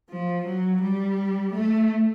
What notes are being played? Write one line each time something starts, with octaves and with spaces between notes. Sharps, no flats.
F3
F#3
G3
A3